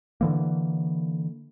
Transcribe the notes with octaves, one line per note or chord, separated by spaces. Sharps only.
D3 E3 A#3